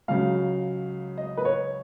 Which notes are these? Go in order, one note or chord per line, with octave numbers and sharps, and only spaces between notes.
C#2 C#3 F#3 F5
D#5
B4
C#5